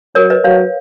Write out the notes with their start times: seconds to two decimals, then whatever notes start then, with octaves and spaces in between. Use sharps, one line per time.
0.15 F#3 A#4 C#5
0.30 B4 D#5
0.44 F#3 C#5 F5